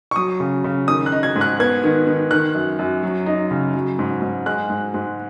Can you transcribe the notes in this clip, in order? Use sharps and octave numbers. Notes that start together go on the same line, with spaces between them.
C#6
F#3 D#6
C#3
C#3
D#3 D#6
F#6
D#4
G#6
G#2
F#6
B3 G#6
D#3
D#3
D#3 F#6
F#2
F#2
F#3
D#4
C#3
F#3
G#2
G#2
G#3 F#6
G#2
G#2